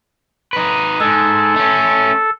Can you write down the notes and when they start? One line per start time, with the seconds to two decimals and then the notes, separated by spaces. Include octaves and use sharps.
0.53 D#4 B4
1.00 G#2 G#3 A4
1.56 A3 C#4